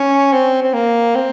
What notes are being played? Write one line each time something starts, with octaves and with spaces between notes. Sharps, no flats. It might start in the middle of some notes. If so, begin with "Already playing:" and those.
Already playing: C#4
C4
C4
A#3
C4